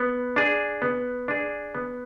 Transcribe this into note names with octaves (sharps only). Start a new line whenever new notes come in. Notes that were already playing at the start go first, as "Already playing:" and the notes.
Already playing: B3
D4 G#4
B3
D4 G#4
B3